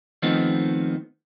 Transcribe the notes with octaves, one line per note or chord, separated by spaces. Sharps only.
D#3 F3 A3 B3 C4 D#4